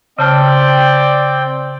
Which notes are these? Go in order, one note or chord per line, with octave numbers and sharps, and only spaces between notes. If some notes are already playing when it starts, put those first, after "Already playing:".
C#3 C4 D5 G5 A5 F6